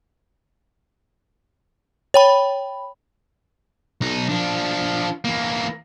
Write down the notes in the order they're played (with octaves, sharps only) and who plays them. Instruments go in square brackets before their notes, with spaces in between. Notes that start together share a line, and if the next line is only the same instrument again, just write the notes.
[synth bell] C#5 G5 B5
[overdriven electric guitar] B1 D#4
F3 D4
E3 A#3